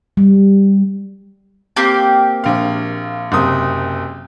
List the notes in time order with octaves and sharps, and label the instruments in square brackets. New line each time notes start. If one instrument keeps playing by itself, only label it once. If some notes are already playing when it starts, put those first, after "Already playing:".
[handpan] G3
[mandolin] A#3 C4 G4
[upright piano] A#1 F5
F#1 C3 D#6